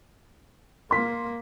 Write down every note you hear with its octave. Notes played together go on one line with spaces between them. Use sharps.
A#3 C6 B6